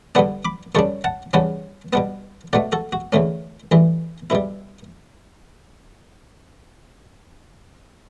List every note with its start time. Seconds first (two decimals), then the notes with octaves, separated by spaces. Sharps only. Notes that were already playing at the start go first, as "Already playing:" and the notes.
0.15 G2 D3 G3 B3 D4 F#5 A5
0.45 B5 D6
0.75 F#2 C#3 G3 D4 A5 C#6
1.04 F#5 A5
1.33 E2 C#3 G3 C#4 F#5 A5
1.93 B2 G3 B3 F#5 A5
2.53 B1 B2 A3 D5 F#5
2.72 F#4 A4
2.92 F#4
3.13 E2 D3 A3 C#4
3.71 A1 G2 E3
4.30 B1 B2 G3 E4